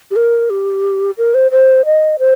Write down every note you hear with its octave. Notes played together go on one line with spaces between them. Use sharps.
G4
A#4
G4
A#4
C5
C5
D#5
C5